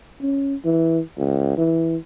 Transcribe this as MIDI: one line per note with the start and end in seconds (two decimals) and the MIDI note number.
0.22 0.55 61
0.65 1.00 52
1.17 1.55 37
1.57 1.96 52